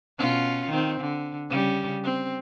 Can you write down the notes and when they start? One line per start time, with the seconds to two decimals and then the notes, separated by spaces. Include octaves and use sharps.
0.18 B2 C#4 F4
0.70 D#3 C4
1.01 D3
1.49 C#3 G3 C#4
2.04 C4